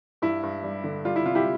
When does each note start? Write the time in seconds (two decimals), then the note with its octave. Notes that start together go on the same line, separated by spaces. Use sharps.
0.22 G2 E4
0.43 G2
0.63 G3
0.84 D3
1.05 G3 F4
1.16 E4
1.25 C3 F4
1.35 E4 G4